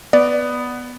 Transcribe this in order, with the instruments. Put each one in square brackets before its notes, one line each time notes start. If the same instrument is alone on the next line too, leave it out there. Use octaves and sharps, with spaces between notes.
[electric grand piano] B3 [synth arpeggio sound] D5